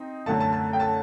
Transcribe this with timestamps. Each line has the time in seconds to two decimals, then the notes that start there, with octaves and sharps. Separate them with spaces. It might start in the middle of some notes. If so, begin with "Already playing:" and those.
Already playing: C4 D#4
0.26 F#2 D3 A3 A5
0.40 A5
0.53 A5
0.73 G5
0.80 A5